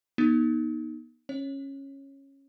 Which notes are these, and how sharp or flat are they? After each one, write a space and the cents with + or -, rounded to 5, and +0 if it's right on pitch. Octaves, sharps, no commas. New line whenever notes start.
B3 -40 D#4 +0
C#4 -15 C#5 -10